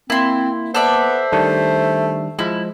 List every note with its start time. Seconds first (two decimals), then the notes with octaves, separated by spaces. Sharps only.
0.10 A#3 C4 E4 C6
0.75 B3 A4 C5 D5 E5
1.33 D#3 G3 A3 D4
2.39 F3 G#3 E4